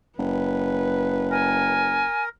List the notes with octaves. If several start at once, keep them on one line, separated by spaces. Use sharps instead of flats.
F#1 B4
A#4 G#5